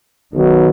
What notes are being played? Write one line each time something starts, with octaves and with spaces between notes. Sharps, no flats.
B1 B2 D#3 F#3